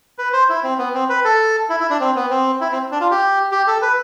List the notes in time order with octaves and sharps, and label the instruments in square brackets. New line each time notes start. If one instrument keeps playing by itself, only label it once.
[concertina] B4
C5
E4
C4
B3
C4
B4
A4
E4
E4
D4
C4
B3
C4
E4
C4
D4
F4
G4
G4
A4
B4